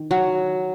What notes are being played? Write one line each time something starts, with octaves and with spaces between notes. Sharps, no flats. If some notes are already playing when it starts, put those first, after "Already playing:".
Already playing: D#3
F#3